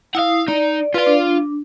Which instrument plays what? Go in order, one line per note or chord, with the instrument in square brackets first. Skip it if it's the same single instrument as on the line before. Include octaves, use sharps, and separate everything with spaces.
[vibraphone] E4 D#6 [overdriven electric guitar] F5 F#5
[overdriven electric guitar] D#4 [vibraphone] D5
[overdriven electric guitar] F4 F5 [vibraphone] B4 D5
[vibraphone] D4